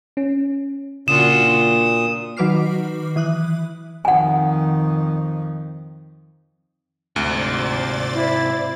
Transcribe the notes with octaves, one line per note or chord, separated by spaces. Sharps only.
C#4
A#2 C#3 D4 F4 F#4 D#6 E7
A#3
D#3 F#3 B4 D6 F6 C7
E3 D#6 F#6
F2 D#3 F#5 G#5
D2 G#2 C3 C5 D5 A6
E4